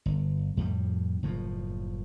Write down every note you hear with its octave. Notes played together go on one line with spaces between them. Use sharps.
G1
F2 A2 G3
F#1 A2 F3